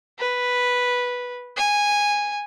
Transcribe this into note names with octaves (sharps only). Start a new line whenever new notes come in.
B4
G#5